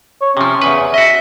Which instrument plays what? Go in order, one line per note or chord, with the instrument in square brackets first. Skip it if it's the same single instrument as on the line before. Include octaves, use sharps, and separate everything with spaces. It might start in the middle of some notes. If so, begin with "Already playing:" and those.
[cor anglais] C#5
[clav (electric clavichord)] C3 F3 [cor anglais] C#4
[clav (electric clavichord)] E2 C#3 B4
[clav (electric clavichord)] F#4 D#5 [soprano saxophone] E5